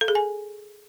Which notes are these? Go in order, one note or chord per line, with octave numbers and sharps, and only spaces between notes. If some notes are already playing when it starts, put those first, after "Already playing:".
A4
G#4
G#5